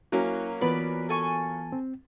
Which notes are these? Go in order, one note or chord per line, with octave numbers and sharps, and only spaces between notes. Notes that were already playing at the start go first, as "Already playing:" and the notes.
F#3 A#3 C#4 E4
E3 B3 F4 B4 D5
A4 G#5 C#6
C4